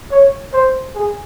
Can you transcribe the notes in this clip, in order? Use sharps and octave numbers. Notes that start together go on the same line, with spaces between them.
C#5
C5
G#4